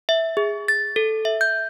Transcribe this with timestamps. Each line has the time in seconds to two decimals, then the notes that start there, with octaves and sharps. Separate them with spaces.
0.09 E5
0.37 G#4
0.68 A6
0.96 A4
1.25 E5
1.41 G6